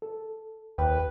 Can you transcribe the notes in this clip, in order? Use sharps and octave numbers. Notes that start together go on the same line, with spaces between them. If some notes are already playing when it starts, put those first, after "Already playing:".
A4
D#2 B4 G5